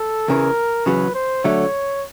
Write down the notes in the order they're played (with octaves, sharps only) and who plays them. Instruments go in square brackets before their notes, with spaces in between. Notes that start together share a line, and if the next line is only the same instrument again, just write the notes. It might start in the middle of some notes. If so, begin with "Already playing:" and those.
Already playing: [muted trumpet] A4
[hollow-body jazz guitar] E2 C#3 E3 [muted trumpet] A#4
[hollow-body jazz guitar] E2 C#3 F#3 [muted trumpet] B4
[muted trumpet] C5
[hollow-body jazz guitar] D3 F#3 A3 [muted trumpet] C#5